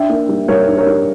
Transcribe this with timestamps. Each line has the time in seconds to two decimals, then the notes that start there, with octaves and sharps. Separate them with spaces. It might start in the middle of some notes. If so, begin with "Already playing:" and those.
Already playing: D4 E5 G5
0.09 A#3
0.29 G3
0.48 G3 A#4 C#5
0.68 D4
0.77 A#4 C#5
0.87 G3